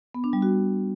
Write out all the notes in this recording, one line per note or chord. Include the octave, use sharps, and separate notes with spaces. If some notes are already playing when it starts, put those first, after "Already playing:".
B3
D4
G3
F#4